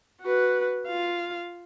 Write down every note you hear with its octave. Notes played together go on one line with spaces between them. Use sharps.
F#4 B4
F4 F5